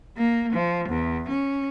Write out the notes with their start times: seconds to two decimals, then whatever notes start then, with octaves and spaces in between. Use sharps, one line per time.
0.17 A#3
0.53 F3
0.89 E2
1.29 C#4